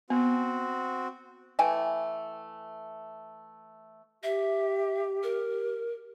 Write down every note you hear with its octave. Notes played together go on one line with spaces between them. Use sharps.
B3 C4 F#4
E3 A3 G5 G#5
G4 E5
A#4